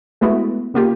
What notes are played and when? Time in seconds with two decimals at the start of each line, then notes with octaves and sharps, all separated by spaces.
0.21 G#3 A3 B3 E4 F#4
0.74 C#3 A#3 F4 G4